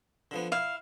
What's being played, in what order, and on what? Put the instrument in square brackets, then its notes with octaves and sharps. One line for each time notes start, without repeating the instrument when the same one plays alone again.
[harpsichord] D3 F3 B3
[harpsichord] E4 [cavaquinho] F5